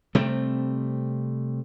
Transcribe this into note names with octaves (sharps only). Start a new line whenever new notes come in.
C3 G3 A3 C4